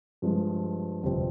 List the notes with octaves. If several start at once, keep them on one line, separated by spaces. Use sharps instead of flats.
G2 F3 G#3
G1 F2 C3 G3 C4